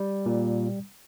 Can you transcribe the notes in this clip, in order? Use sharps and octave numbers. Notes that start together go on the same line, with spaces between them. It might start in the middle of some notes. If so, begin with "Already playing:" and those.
Already playing: G3
A#2